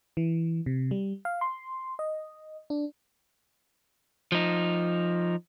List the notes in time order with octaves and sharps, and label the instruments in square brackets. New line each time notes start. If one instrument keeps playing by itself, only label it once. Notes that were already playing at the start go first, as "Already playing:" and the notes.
[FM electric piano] E3
C3
G3
F5
C6
D#5
D4
[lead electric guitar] F3 D#4